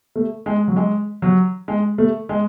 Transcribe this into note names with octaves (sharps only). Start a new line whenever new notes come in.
A3
G#3
F#3
G#3
F#3
G#3
A3
G#3